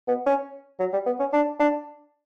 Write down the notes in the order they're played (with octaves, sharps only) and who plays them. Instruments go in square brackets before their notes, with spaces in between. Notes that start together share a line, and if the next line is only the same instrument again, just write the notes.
[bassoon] B3
C#4
F#3
G3
B3
C#4
D4
D4